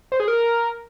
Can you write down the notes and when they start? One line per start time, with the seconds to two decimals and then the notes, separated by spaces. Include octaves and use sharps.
0.12 C5
0.20 G#4
0.28 A#4